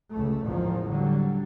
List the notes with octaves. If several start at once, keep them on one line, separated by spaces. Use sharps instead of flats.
C#2 A3
A1 E2 G#2 D#3 F3
D3 F#3 G3